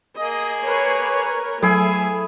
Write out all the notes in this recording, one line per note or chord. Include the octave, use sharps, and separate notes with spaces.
A#3 G#4 D#5
A#4 B4 C#5
F#3 A3 E4 G#4 A4 G#5